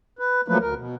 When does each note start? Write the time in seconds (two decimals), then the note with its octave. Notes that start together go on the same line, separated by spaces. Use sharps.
0.19 B4
0.48 F3 F#3 A3 A#3 B4
0.60 D2 A#4
0.76 B2